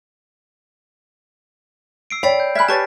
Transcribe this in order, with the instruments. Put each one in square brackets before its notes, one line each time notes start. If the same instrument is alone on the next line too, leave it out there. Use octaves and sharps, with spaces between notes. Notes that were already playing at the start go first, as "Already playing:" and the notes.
[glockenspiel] E6 C7 D7
[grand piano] C#5 [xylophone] D5 G5 B6 [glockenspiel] B5 C7 D7
[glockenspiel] G6
[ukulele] E5 B5 [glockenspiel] G#5 F6 B6 [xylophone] F#6 G#6
[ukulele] G4 B4 C#5 [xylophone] A5 C#6 A6